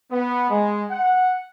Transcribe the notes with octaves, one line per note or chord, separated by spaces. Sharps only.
B3
G#3
F#5